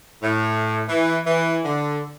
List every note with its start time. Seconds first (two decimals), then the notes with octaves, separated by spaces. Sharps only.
0.22 A2
0.89 E3
1.27 E3
1.65 D3